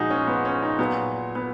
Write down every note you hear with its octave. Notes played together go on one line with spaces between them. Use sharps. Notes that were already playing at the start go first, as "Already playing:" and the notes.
Already playing: A#2 F3 G#3 D#4 F#4 G#4
C#4
B3
C#4
D#4
A#2 F#3 B3
B3